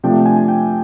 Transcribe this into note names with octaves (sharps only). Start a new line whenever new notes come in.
C3 F3 A3 D4 G5
G#5
G5